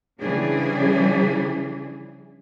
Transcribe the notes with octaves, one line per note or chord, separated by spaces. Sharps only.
C#3 E3 F3 G3 D4 G#4